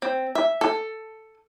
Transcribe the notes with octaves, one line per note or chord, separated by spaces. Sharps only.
C4
E5
A4